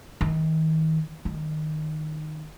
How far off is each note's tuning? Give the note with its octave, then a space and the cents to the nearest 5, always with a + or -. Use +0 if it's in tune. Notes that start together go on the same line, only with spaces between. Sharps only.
D#3 +35
D#3 -15